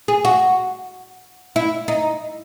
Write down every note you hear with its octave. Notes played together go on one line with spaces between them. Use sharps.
G#4
F#4
E4
D#4